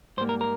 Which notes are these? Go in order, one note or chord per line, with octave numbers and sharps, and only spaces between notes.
G#2 G3 A#3 C5
A#4
A#4